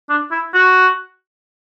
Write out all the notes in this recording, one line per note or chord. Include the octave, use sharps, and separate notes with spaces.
D4
E4
F#4